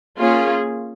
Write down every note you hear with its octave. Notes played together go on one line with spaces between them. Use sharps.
A#3 C#4 F4 G#4